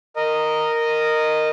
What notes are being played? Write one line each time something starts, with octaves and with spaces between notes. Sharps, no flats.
A#4 D#5